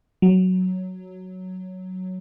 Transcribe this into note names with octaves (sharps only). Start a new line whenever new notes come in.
F#3